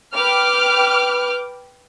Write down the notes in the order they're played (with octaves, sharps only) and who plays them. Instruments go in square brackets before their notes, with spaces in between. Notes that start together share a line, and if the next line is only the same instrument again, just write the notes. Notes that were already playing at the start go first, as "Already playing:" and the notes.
[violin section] B4 G5 D6 F6